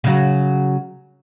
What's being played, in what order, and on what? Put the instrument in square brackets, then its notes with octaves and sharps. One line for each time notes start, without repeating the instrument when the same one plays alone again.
[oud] C#3 F#3